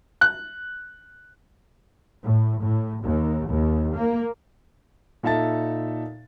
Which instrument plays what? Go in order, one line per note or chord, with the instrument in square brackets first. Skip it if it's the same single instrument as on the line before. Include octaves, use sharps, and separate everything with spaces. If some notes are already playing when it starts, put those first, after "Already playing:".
[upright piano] F#6
[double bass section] A2
A2
D#2
D#2
A#3
[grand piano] A#2 D#4 A4 E5 A5 A6